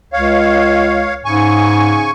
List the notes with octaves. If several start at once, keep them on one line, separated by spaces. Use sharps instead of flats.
C#2 C#5 F5
G#2 C#3 G#5 C#6